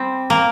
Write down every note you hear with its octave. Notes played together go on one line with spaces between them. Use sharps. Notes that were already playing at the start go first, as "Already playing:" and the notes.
Already playing: G3 C4
A#3